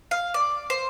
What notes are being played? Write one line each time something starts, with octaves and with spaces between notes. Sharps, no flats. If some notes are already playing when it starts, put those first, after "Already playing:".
F5
D5
C5